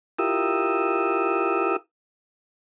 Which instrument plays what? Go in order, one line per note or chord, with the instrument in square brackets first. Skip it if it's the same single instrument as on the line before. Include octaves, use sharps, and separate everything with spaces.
[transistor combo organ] E4 F4 G4 A#4 D#6 E6